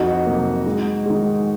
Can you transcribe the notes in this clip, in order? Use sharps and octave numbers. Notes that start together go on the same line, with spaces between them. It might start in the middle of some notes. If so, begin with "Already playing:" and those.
Already playing: F2 D#4 F#4
C3 F#3 A#3
G#2
D#3 G#3